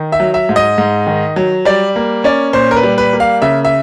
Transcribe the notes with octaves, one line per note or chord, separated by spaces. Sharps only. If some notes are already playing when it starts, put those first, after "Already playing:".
Already playing: D#3
E5
F#3
E5
G#2
D#5
G#2
D#3
F#3
G3 D5
A#3
C#4 D5
A#2 C5
A#4
B4
G3
B4
A#3
F5
C#3 E5
E5